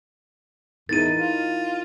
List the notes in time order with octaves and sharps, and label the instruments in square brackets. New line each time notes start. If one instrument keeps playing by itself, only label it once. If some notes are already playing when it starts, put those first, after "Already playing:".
[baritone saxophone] E2 [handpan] D#4 E4 A#4 [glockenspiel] A6 D#7
[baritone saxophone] F4